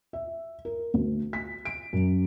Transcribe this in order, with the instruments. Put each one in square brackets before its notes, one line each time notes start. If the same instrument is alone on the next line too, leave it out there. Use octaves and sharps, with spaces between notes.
[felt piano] E5
A#4
D2
B6
D7
F#2